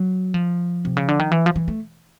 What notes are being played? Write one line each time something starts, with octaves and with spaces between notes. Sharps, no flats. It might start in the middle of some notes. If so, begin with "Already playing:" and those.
Already playing: F#3
F3
C3
C#3
D3
D#3
E3
F3
E3
A3